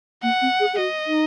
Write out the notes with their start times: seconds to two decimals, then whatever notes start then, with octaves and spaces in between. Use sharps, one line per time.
0.23 A#3 F#5
0.42 C4
0.60 G#4
0.74 G#4
0.78 F#4 D#5
1.07 D#4